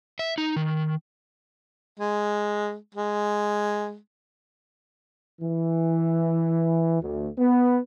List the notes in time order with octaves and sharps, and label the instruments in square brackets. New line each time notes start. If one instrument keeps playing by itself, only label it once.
[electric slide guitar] E5
D#4
D#3
[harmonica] G#3
G#3
[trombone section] E3
D2
B3